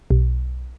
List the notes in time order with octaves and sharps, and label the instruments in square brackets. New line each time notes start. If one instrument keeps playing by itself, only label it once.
[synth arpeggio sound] B1